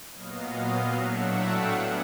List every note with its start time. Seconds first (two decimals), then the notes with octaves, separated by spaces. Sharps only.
0.13 A#2 F#3 B3 D#5 F5
0.93 A2 F#3 A3 D4 E5 F#5
1.32 F5 G5
1.72 G3 B3 F#5 G#5